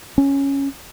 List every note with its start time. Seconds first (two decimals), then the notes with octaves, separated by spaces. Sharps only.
0.18 C#4